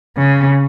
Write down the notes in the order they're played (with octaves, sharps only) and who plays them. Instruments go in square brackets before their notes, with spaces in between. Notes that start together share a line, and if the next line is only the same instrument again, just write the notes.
[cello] C#3